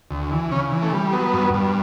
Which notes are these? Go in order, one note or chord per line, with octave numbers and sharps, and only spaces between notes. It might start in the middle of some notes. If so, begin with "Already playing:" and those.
D2
E3
C#3 C#4
E3
A3
G3
F#3 B3
G2
G2